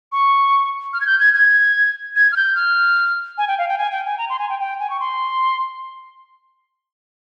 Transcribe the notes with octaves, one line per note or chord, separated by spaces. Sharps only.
C#6
F6
G#6
G6
G#6
G#6
G#6
F6
G6
F6
G#5
G5
F5
G5
G#5
G5
G#5
A#5
C6
G#5
G5
G5
G#5
C#6
C6